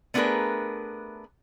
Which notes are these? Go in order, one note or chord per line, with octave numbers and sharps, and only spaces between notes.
A3 B3 D4 G#4 A#4 B4